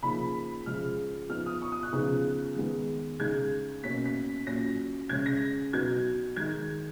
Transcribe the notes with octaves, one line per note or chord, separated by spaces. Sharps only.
C#3 F3 A#3 D#4 B5
C#3 F3 G#3 F6
F3 B3 D#4 F6
D#6
C#6
D#6
F#6
C#3 F3 B3 D#4 F#6
D#3 G#3 B3
C#3 G#3 D#4 G#6
B2 A#3 C#4 B6
B6
A#2 F#3 C#4 A#6
C#3 G#3 C#4 G#6
A#6
B2 F#3 B3 D#4 G#6
D#3 G#3 D#4 G#6